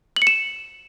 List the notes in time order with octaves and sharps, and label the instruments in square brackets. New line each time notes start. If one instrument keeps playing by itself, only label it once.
[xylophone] F#7
C#7
E7